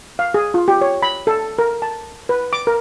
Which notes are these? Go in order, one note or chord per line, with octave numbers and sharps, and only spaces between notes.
F5
G#4
F4
G4
C#5
B5
A4
A#4
A5
B4
D6
A#4